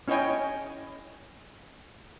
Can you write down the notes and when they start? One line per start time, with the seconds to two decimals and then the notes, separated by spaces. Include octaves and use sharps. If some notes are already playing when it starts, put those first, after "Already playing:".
0.08 C#4 E4 C#5 D#5 G5 G#5